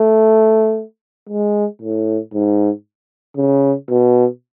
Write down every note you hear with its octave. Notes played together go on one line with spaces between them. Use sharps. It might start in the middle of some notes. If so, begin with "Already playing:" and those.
Already playing: A3
G#3
A2
G#2
C#3
B2